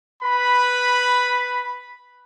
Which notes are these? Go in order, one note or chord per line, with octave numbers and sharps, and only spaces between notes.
B4 B5